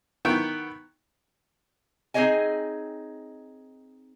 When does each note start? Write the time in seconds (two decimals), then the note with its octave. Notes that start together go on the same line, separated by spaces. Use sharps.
0.25 D#3 B3 E4 G5 C#6
2.14 C4 D#4 G#4 C#5 D#5 G#5